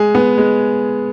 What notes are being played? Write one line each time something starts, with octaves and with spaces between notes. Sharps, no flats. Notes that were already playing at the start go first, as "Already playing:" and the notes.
Already playing: G#3 G#4
B3
G#3